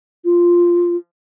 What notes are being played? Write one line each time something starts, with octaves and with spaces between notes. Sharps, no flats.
F4